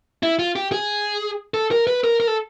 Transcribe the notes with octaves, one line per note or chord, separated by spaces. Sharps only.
E4
F4
G4
G#4
A4
A#4
B4
A#4
A#4
A4